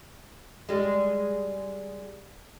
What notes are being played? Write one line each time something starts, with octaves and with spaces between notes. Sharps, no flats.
G3 G#3